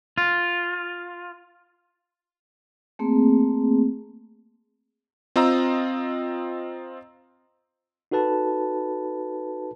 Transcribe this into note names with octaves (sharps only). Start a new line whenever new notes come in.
F4
A3 A#3 C4 G#4
C4 F4 D#5 A#5 E6
D#4 F#4 A4 B4 A5